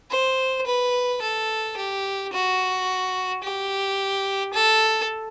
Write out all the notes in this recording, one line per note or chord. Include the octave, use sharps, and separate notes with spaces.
C5
B4
A4
G4
F#4
G4
A4